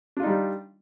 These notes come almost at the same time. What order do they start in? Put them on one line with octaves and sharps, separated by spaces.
D4 F4 D#4 G3